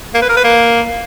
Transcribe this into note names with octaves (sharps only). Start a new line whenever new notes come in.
A#3
B4
A#4
B4
A#3